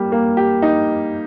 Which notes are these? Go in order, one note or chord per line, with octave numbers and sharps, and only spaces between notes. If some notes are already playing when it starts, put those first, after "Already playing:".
Already playing: G3 A#3 G4
A#3
G4
D#4